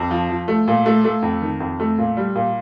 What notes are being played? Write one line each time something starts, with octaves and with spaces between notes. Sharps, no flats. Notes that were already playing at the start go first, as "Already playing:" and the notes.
Already playing: F2
F3
F3
A3
A#2
A3
A3
F2
D#3
F2
A3
A#2
G3
A#2